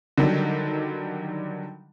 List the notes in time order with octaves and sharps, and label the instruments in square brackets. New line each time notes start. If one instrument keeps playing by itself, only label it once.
[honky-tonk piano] D3 D#3 F#3 G3